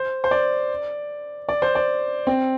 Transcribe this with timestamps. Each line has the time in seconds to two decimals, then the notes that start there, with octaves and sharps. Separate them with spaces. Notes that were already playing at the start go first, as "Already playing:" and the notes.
Already playing: C5
0.24 C5
0.31 D5
1.49 D5
1.62 C5
1.75 D5
2.27 C4